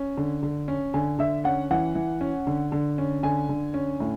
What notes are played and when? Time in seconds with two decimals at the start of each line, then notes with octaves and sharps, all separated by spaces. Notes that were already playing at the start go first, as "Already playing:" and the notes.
Already playing: C#4
0.17 D3
0.43 D3
0.68 C#4
0.94 D3 G#5
1.19 D3 E5
1.44 C#4 F#5
1.71 E3 F#5
1.95 E3
2.21 C#4
2.47 D3
2.72 D3
2.98 C#4
3.23 D3 G#5
3.49 D3
3.74 C#4
4.00 A2